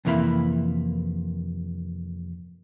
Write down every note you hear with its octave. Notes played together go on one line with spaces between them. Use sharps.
F2 C3 E3 A#3 E5 B5